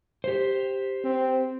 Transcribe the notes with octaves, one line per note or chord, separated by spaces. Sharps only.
G4 C5
C4